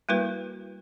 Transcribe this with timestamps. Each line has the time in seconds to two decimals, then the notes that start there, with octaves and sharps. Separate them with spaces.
0.09 G3 A#3 E4 F#4 A#4 B4